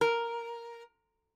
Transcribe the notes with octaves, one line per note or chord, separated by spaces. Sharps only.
A#4